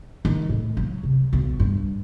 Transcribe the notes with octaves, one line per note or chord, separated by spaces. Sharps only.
D#3
A2
F#3
C3
B1
G2